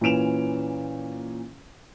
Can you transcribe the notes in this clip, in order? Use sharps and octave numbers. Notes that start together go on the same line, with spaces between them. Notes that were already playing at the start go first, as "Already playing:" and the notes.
A#2 E3 C#4 D7 E7 F7